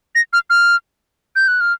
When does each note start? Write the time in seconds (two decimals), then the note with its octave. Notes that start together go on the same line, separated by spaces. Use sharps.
0.15 A#6
0.33 F6
0.50 F6
1.36 G6
1.48 F#6
1.61 F6